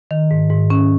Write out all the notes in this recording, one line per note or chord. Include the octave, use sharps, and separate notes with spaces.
D#3
G#2
G#2
C#4